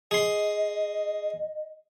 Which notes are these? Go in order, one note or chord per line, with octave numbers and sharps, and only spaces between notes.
G#4 D#5 C6